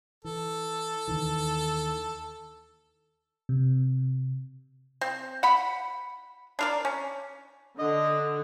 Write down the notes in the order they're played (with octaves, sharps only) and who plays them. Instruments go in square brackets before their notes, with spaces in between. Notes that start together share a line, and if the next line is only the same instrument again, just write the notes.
[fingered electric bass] E3 [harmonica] A4
[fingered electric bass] D#2 D#3 E3
[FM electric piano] C3
[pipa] C4
F#5 B5
D4 A#4 D5
C#4
[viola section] D3 [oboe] D#5